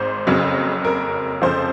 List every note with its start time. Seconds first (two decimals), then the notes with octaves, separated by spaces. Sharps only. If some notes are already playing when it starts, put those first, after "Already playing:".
Already playing: G#1 G#2 C5
0.27 F#1 F2 C#3 F#3
0.85 A#4
1.42 F1 F2 C#3 F3 C5